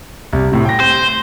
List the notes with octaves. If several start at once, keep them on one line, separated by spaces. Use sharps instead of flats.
C2
A2 C3
G5 A#6
C5